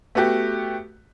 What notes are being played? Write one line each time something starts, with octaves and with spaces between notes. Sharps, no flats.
A3 B3 F#4 G4